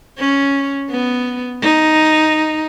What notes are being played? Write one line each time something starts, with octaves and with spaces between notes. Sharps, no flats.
C#4
B3
D#4